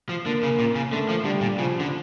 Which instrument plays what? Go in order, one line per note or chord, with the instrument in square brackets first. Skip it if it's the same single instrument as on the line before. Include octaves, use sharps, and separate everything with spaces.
[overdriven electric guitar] F3
[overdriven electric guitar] D3 [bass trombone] A#3
[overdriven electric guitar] C#3
A#2
C#3
[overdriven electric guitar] D3 [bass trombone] A3
[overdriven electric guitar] F3
[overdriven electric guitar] D3 [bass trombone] G3
[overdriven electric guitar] A#2
[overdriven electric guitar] C#3 [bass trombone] F3
[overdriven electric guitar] D3